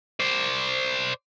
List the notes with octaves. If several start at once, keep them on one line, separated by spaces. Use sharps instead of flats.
C5 D5